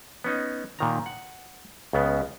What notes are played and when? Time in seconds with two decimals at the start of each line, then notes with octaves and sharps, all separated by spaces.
0.24 B3 C#4 D#4
0.79 A#2 D#3 A#5
1.06 F#5
1.93 C#2 C#3 B3